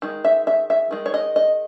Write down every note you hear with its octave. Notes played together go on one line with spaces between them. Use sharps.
D#3 G#3
E5
E5
E5
D#3 G#3
C#5
D#5
D#5